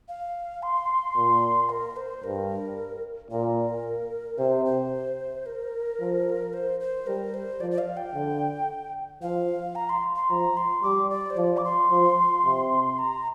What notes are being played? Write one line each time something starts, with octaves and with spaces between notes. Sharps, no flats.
F5
C6
A#2
A#4
C5
G2 A#4
A#2 A#4
C3 C5
C5
A#4
F3
C5
C5
G3 A#4
C5
F3 D5
D5
F5
G5
D3
F3 F5
A#5
C6
C6
F3 A#5
C6
G3 D6
D5
C5
F3 D5
D6
C6
F3
C3
A#5